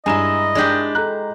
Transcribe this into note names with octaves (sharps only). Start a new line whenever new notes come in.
G2 G#3 E4 D#5 G#5 A#5 E7
G#3 D4 G4 D5
A4 A#5 F#6